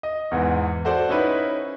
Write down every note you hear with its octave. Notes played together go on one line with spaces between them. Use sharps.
D#5
E2 G#2 E3
F#4 A4 C5 D5 F#5
C#4 D#4 E4 B4